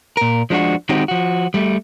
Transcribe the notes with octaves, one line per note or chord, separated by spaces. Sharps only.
A#2 A#4
F3 G#3 D4 E4 F#4
D#3 G#3 C4 D#4 F#4 G4
F3 F#4
G3 A3